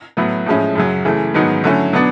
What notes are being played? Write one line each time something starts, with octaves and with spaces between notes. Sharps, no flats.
A2 F#3 B3 E4
A2 F3 G#3 C#4 E4
F#2 C#3 F#3
C#3 E3 A3
G#2 D#3 F#3 B3 D#4
D3 F#3 A3 C#4 E4
B2 F#3 B3 D4